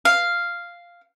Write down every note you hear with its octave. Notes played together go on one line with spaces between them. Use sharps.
F5